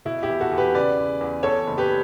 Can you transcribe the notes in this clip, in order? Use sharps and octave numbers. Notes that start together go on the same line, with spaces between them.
B2 E4
E4 G4
E2
F#4 A4
E2
G4 B4
C#3 B4 D5
E2
E2
E2 A4 C#5
F#1
G4 B4